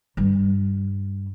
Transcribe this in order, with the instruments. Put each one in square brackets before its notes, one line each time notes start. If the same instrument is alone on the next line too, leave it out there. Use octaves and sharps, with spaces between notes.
[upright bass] G2 G3